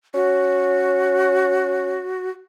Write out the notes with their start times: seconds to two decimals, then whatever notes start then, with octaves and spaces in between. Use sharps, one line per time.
0.14 C#4 F#4